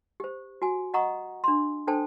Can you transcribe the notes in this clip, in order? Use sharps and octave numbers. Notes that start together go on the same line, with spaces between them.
G4 C5
F#4 G#5
D#5 F#5 A#5 C#6 D#6
D4 C6
D4 A4 C5 G5 A5